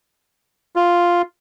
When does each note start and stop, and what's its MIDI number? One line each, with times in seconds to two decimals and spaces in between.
0.76 1.22 65